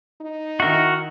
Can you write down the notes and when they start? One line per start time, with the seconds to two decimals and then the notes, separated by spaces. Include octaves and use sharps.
0.21 D#4
0.60 D#3 E4 F#4 A#4